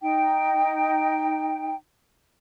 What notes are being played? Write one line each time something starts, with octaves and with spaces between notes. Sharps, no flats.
D#4 G5